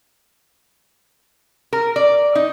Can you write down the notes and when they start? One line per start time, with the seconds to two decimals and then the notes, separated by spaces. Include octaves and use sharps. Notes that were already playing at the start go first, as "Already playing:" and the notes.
1.73 A#4
1.96 D5
2.35 D#4